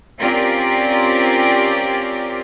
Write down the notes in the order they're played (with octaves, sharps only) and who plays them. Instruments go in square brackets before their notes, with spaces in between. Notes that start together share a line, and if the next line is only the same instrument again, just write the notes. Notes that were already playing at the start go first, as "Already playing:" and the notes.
[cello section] C4 C#4 F4 G4 A#4 D5